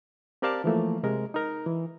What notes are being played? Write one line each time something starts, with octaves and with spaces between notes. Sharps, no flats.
C4 G4 A#4 D5 F5 A5
E3 F3 A3 A#3
C3 G#3 A#4
D#4 A#4
E3